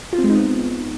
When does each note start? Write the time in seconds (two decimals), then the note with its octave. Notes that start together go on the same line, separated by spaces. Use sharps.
0.13 F4
0.18 C4
0.24 G#3
0.30 D#4
0.35 B3